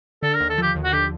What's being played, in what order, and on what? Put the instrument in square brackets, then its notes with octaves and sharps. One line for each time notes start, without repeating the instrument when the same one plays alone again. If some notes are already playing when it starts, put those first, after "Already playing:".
[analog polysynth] D3 [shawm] A4
[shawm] A#4
[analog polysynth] D#2
[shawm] A4
[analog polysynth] F3 [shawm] G4
[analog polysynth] D#2
[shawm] F#4
[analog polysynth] D3 [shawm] G4